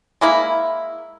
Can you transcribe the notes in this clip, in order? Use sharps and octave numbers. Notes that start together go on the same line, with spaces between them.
G#3 A#3 E4